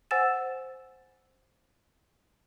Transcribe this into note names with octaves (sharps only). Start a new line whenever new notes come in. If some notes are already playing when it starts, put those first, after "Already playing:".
C5 F#5 G#5 E6 A6 E7